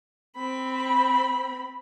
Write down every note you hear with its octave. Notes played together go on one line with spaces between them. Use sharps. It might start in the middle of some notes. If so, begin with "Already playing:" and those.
C4 B5